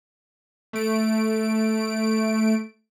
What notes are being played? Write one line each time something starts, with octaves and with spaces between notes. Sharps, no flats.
A3 D7